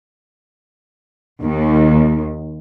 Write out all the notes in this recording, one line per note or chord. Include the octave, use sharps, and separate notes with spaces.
D#2